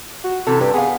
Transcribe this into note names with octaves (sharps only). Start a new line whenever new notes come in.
F#4
C3 E3 C#4 A4
G2 G4
B3 G#4 C#5 F5